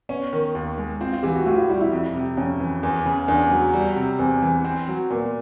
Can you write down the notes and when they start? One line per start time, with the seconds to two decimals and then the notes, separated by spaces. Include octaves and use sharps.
0.09 B3 C#4
0.33 D#3
0.55 D#2
0.77 G#3
1.00 C4 F4
1.13 F4
1.23 E3 G4
1.35 F#4
1.46 A2 F4
1.57 F4
1.69 G3 E4
1.81 E4
1.92 F2
2.15 C3
2.37 F2 C#4
2.60 E3
2.83 E2
3.06 C#3
3.28 E2 D4
3.51 F#3
3.74 G3
3.96 C3
4.19 E2 C4
4.42 E3
4.64 C4
4.88 F#3
5.10 A#2 B3